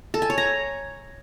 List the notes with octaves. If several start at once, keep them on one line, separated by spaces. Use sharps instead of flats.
A4
G#5
C#5
A#5